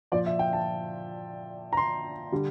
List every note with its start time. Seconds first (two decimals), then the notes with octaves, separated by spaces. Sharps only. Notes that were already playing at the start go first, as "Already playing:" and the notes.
0.12 A#2 F3 D5
0.26 E5
0.39 G5
0.53 A5
1.73 A#5
1.77 C6
2.32 D3 G3